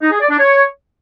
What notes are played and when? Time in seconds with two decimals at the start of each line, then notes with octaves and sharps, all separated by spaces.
0.02 D#4
0.11 G#4
0.20 D5
0.30 D4
0.39 C#5